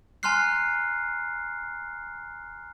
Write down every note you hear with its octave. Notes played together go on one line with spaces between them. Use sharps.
G#5 A#5 C6 F6 F#6 C7